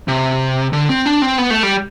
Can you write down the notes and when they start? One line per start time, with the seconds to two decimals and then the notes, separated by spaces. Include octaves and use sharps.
0.08 C3
0.73 D3
0.89 C4
1.06 D4
1.22 C4
1.38 B3
1.50 A3
1.63 G3